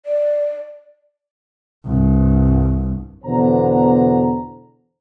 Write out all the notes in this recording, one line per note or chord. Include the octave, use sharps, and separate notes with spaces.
D5
C2 G2
E2 B2 D3 B3 C5 A#5